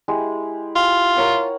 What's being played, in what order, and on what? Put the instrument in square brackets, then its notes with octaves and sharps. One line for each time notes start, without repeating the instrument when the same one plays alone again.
[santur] G#3 E4 G4
[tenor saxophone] F4 [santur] G4
[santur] A#4 C#5 F#5